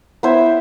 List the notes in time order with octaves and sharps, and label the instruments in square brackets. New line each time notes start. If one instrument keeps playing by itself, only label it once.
[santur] B3 E4 C5 E5